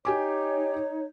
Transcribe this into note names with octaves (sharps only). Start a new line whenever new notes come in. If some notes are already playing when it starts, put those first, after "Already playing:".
D#4 G4 C#5 G#5 D6